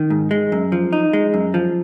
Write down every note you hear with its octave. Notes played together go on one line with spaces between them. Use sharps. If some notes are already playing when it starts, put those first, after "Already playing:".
Already playing: D#3
G#2
G#3
F#2
F3
D#4
G#3
F#2
F3